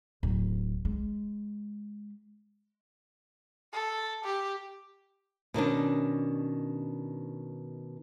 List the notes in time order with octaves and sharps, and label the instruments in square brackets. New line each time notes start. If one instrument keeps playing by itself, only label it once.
[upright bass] D1
G#3
[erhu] A4
G4
[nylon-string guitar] B2 D#3 C#4 D4